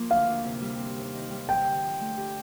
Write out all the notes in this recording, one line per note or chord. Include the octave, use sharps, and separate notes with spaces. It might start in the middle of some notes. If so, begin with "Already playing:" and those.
Already playing: F3 A#3
D2 F5
D2
C3
G3
C4
D#2
D#3
G3
D#4 G5
D3
F3
A3
G4